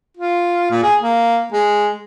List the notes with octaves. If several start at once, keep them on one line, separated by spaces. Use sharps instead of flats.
F4
A#2
G#4
A#3
G#3